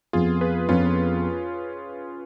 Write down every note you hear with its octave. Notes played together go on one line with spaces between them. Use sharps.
F2 F3 B3 F4 G#4
G#4 B4
F2 F3 B3 C#4 F4